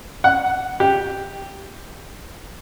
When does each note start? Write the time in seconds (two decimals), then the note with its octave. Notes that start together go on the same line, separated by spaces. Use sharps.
0.24 F#5
0.80 G4